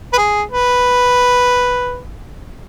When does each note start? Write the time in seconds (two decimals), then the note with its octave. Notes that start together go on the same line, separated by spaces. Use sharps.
0.13 B4
0.18 G#4
0.52 B4